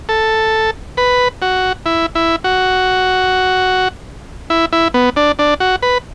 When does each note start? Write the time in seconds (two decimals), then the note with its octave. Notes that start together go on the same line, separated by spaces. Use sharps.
0.09 A4
0.97 B4
1.42 F#4
1.86 E4
2.15 E4
2.44 F#4
4.50 E4
4.73 E4
4.94 B3
5.16 D4
5.39 D4
5.60 F#4
5.82 B4